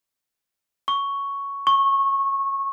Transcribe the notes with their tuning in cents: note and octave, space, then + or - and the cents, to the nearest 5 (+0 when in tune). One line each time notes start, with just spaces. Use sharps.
C#6 +5
C#6 -20